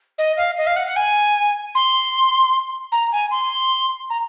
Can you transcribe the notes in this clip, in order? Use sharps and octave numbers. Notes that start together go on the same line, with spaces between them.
D#5
F5
D#5
F5
F#5
F#5
G#5
C6
A#5
G#5
C6
A#5